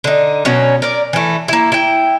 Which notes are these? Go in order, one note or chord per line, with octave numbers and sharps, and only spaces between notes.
D3 D#4
B2 F#3 C#4
A#4 D5
E3 A3
A#3 E4
E4 G5